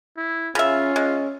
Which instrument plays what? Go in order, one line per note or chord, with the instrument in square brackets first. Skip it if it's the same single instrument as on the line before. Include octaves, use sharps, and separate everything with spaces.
[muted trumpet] E4
[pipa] C#3 E5 [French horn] C#4 [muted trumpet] F4
[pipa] G#3